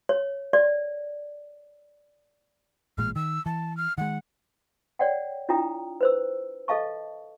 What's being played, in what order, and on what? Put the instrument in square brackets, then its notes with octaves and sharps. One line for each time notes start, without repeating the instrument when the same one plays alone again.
[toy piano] C#5
D5
[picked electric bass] A1 A#2 G#3 [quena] F6
[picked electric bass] D#3 [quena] E6
[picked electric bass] E3 [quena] A5
[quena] F6
[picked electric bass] D#3 G#3 [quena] F#5
[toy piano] C#5 D5 F#5 G5
D4 E4 F4 G5 A#5 D#6
B4 C5 E6
A4 D#5 F5 A5 C#6